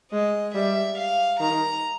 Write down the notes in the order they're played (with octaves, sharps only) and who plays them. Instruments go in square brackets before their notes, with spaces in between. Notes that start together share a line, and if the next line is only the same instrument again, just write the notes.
[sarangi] G#3 [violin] D#5
[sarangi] G3 [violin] E5
[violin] F5
[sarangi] D#3 [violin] A#5